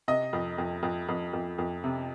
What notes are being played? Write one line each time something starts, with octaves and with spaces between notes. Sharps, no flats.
C3 D#5
F2
F2
F2
F2
F2
F2
C3